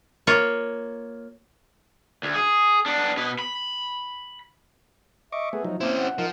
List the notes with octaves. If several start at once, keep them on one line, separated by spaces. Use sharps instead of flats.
A#3 F4 C#5
D2
G#4
B3 D4
B2 B4
B5
D#5 E5 C#6 D6
A3 B3 G#4
F3 F#3 D#4
A#3 C4 C#4 E4 C5
F#5
F3 D#4 A#4 F5